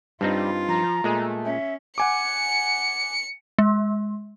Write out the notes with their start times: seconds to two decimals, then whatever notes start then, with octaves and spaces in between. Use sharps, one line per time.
0.21 G2 G3 C4 D#4 F4
0.69 F3 A#5
1.04 A#2 G#3 A3 G#4
1.45 C#4 E5
1.98 F#5 G#5 D6 C#7
3.59 G#3